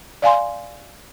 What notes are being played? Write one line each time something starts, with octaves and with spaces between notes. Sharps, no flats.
D5 F5 G#5 C6